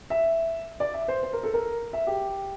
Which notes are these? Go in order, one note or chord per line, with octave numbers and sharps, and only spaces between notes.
E5
D5
E5
C5
C5
A#4
A4
A#4
E5
G4